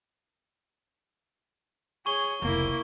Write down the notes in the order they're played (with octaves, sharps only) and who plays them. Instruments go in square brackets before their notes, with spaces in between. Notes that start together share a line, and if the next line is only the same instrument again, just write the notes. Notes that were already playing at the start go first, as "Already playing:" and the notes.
[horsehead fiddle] G#4 C#5 [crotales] C#6 G7
[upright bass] F1 C#2 [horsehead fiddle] A#3 E4